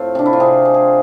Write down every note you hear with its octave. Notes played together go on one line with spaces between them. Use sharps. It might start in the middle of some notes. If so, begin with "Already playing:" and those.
Already playing: A2 A3 C4 F4
C3 D4
E4
F4
C3 G#4
G#3
G#4